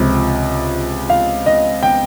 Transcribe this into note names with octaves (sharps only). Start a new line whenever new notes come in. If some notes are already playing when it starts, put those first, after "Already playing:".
Already playing: C#2 C3 F3
F5
D#5
G5